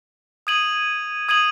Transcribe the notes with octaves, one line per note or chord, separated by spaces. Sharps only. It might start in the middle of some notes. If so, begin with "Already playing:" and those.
D#6 G#6 D#7 F#7
D#6 G#6 D#7 F#7